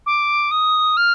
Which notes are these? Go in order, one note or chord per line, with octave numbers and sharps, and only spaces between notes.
D6
D#6
F6